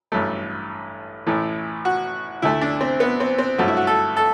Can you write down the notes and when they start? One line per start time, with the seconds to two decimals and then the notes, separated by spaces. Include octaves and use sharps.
0.12 A1 G2 F#3 A3
1.27 A1 A2 E3 A3
1.85 F#4
2.42 D2 D3 A3 E4
2.61 D4
2.81 C4
3.00 B3
3.20 C4
3.38 C4
3.58 G2 F#3 A3 F#4
3.68 E4
3.77 F#4
3.87 A4
4.17 A4